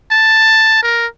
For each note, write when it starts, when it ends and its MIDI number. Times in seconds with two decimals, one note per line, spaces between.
0.12 0.79 81
0.83 1.06 70